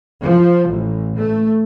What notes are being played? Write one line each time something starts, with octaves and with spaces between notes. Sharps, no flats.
F3
A1
A3